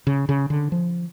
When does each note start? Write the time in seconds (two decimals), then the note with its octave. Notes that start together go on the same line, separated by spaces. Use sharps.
0.07 C#3
0.29 C#3
0.50 D3
0.72 F3